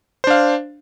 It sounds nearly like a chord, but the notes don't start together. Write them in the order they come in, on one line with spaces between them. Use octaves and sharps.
C5 D4 F5